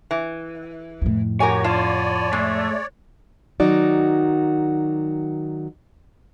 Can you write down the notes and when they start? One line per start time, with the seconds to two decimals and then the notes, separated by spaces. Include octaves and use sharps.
0.11 E3
1.02 F2 A2
1.40 F#4 G4 A#4 C#5 G#5
1.64 F4 C#5 D5 F#5 A5
2.33 G#3 A3
3.60 D#3 F#3 D#4 F#4 D5